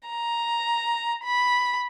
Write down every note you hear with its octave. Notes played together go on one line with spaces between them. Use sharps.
A#5
B5